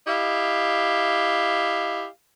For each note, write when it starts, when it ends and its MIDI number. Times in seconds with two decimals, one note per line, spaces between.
0.07 2.07 64
0.07 2.07 67
0.07 2.07 75
0.07 2.07 77